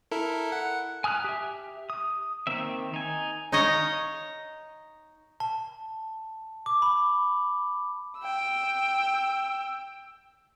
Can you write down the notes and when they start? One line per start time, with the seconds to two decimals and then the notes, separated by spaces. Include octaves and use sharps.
0.11 E4 A4 A#4
0.52 F#5
1.04 G#5 D#6 F6 F#6
1.24 G4 E5
1.90 D#6
2.47 D#3 A#3 C4 E5
2.94 D#4 G#5
3.52 D#4 C#5 D#5 F5
5.40 A5
6.66 D6
6.82 B5
8.20 G5 E6